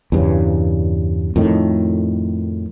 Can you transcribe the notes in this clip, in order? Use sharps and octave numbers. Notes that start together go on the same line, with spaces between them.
E2 G2 C#3
F2 A2 D#3